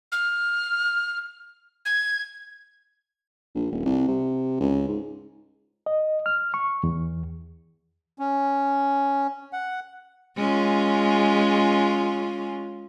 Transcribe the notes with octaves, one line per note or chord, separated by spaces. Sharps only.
F6
G#6
A#1
D#1
C2
C3
C#2
G#2
D#5
F6
C#6
E2
C#4
F#5
G#3 C#4 F4